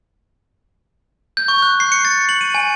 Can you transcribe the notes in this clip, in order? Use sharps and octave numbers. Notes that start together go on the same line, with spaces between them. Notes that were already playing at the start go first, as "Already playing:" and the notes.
G6
C#6
F#6
C7
C#7
A6
F#7
D#7
G#5